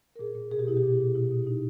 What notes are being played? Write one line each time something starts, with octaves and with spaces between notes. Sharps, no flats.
A#4
A#2 G#4
A#2
B2 G#4
G4
B2 E4
G4
A#2
A#2
B2 E4
B2
B2 D#4